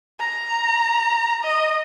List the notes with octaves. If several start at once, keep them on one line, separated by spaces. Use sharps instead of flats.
A#5
D#5